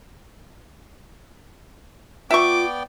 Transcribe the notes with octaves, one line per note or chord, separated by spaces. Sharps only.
B3 F4 D5 E5 G5 C#6 D6